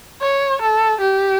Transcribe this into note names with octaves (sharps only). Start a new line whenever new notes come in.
C#5
A4
G4